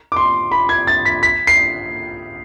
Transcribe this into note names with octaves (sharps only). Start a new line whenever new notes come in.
D6
C6
B5
G#6
A6
B6
B6
C7